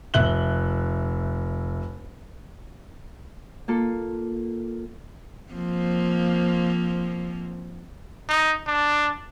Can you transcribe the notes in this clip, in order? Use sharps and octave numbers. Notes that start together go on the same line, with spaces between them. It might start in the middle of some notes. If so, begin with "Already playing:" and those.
F1 E5 F#6 F#7 G7
A#3 F4 A4
F3 A#3 C4
D#4
D4